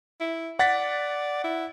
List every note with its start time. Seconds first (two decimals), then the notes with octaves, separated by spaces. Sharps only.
0.20 E4
0.59 D5 F#5 A6 B6
1.44 E4